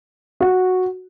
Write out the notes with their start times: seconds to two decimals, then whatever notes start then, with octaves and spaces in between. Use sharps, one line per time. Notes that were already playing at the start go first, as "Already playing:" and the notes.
0.40 F#4